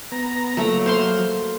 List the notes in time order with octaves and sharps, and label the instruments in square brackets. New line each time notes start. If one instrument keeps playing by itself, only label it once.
[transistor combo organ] B3 A#5
[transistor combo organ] F#3 [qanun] A3 A#3 A#5
[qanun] C5 F5 C6